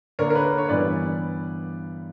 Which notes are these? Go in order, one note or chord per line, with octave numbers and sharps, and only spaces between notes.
D3 A#3 D4 A#4 C#5
A#4
B4
C#5
G2 E3 G3 B3 B4 D5